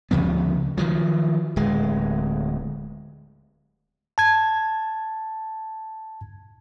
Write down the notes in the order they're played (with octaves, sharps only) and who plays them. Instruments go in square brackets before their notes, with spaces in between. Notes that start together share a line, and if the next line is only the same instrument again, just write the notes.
[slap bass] D2 C#3 F3 B3
D#3 F3 F#3
D1 G#3
[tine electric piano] A5 G#6